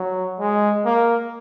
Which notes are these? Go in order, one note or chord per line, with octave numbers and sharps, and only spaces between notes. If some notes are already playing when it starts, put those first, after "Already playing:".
Already playing: F#3
G#3
A#3